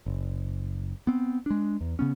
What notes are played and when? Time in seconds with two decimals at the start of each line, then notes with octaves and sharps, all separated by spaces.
0.06 F#1
1.07 B3 C4
1.46 G#3 D4
1.81 E2
1.99 C#3 B3 C#4